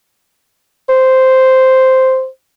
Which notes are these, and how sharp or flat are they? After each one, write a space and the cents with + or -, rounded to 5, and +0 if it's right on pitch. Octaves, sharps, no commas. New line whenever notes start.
C5 -5